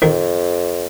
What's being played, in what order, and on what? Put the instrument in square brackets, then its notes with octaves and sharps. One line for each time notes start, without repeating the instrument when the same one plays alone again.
[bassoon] F2 [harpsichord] D#3